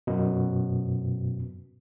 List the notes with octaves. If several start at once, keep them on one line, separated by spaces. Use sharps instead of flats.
F#2 B2